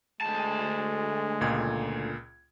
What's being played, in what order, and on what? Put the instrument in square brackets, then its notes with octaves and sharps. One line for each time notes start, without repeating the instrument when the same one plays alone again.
[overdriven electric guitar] D2 A5 [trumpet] G#3
[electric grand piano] C#2 A#2 G#6